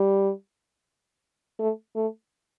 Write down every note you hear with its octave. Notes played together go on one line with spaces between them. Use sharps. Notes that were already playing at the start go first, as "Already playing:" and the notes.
Already playing: G3
A3
A3